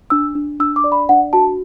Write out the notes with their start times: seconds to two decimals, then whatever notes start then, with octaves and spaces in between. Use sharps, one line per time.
0.10 D4 E6
0.35 D4
0.60 D4 E6
0.76 D6
0.84 D5
0.92 B5
1.09 D4 F#5
1.33 F#4 A5